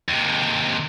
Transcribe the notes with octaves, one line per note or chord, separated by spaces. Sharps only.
D#2 C3